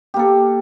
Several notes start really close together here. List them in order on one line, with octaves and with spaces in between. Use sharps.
G4 A#3 A4